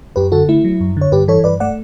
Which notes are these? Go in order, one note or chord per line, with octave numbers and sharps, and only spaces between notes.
F#2 G4 B4
D3 F#4 A4
A3 E4
F#3
F#2
D3 C#5
G2 G4 B4
E3 A4 C#5
G2 B4 D5
A3 D5 F#5